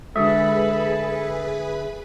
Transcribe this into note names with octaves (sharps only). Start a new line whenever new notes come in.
D3 G#3 F#4 G#4 A4 B4 E5 B5